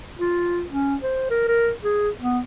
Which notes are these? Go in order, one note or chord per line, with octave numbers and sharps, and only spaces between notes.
F4
C#4
C5
A#4
A#4
G#4
B3